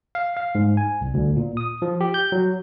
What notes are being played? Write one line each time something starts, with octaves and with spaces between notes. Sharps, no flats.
F5
F5
G#2
G#5
C2
D2
A#2
D#6
F3
G4
G6
F#3